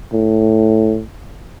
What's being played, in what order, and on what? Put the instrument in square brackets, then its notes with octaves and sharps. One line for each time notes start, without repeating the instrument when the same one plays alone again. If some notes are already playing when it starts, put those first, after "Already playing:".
[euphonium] A2